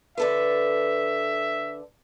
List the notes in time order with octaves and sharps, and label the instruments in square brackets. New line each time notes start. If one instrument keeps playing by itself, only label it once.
[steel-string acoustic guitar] D3 A4 B4 [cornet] E5